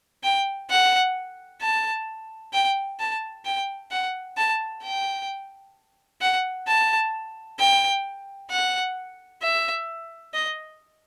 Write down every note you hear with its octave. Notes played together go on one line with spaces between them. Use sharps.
G5
F#5
A5
G5
A5
G5
F#5
A5
G5
F#5
A5
G5
F#5
E5
D#5